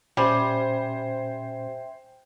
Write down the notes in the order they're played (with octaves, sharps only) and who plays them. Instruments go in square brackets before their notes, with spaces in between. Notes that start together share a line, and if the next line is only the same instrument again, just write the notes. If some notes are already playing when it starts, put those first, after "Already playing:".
[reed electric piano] A#2 C#4 G4 [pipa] G3 [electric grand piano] C5 G#5 [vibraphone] E5 G5